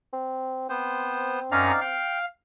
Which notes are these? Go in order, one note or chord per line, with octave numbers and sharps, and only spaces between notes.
C4
B3 C4 C5
F#2 C#4 D#4 D5 F5 A#5
F5 G5